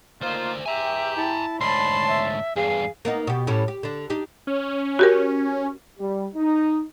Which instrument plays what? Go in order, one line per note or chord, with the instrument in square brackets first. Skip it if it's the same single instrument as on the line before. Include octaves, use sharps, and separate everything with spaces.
[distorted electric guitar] D2 C5 [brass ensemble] A#3 D#4 F4
[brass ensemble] E2 G4 G5 [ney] E5 [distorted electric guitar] G#5 A#5
[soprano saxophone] E4 [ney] A5
[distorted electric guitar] D2 G#2 [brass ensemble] C#5 A5 [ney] B5 [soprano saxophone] C6
[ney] E5
[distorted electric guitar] E2 G2 [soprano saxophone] G#4 [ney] F5
[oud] A#3 B3 D#4
B2 G4
A2 G3 C#4
G4
D3 D4
D4 D#4 G4
[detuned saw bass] C#4
[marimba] F#4 G4 A#4
[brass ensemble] G3
D#4